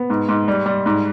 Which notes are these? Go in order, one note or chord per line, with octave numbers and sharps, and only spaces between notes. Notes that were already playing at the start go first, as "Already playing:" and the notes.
Already playing: B3
G#2
G#2
G3
G3
G#2